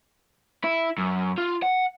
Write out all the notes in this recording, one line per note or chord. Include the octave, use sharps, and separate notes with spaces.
E4
F#2
F4
F#5